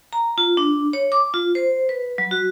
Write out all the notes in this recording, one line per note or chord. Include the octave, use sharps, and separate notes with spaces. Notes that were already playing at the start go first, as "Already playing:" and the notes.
A#5
F4
D4
C#5
D6
F4
C5
B4
F#3
F#4